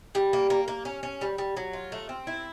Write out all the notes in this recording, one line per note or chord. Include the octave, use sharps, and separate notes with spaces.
G3
A#3
A#3
A#3
C#4
C#4
G3
G3
F#3
F4
A3
C4
E4